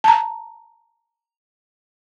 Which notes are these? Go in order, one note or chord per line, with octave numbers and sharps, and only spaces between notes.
A5 A#5